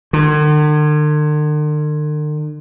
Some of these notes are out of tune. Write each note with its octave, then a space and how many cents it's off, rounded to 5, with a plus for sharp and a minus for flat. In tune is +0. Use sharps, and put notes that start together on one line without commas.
D3 +45